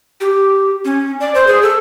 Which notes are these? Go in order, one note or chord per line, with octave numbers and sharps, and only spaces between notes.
G4
C#4
D5
C5
G#4
A4